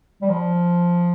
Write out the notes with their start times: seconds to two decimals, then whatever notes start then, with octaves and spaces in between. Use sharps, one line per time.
0.22 G3
0.29 F3